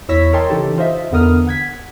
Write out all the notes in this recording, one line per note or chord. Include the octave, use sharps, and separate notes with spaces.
E2 E4 C#5 E6 A#6 B6
A#4 C#5 D#5 G5 A5 C6
C#3 E3 D#4 G4 A4
F4 C5 D#5 E5
E2 D3 B3 A#4 D#6 F6
F#5 G#6 B6